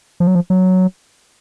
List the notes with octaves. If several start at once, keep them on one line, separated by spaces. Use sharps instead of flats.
F3
F#3
F3
F#3